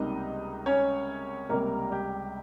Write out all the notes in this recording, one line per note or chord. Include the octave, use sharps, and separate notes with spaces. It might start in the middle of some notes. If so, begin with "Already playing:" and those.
Already playing: C#2 C3 G3 A#3 D#4 D#5
C#4 C#5
C#2 C3 G3 A#3 A#4
G3 G4